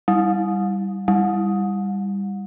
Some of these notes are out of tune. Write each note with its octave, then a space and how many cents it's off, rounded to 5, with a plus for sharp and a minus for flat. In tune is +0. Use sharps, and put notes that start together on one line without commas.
G3 +0
G3 +15